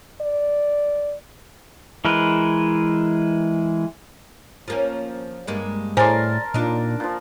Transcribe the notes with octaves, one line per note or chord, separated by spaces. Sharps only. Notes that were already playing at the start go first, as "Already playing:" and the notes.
D5
E3 G#3 A#4 B4
F3 A#3 C#4
G2 G#3 A#3
A2 G#4 A#4 C5 D5 G#5 A5 C6
A#2 D4 D#4
A#2 F3